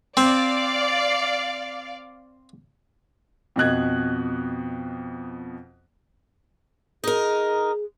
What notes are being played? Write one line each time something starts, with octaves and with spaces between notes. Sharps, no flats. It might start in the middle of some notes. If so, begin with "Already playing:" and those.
C4 D5 F5
F2 B2 D#5 F#6 G#6
D#4 G#4 A#4